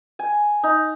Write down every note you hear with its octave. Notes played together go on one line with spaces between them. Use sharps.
G#5
D#4